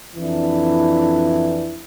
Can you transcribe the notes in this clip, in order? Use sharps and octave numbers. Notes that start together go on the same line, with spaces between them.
F2 E3 D4 E4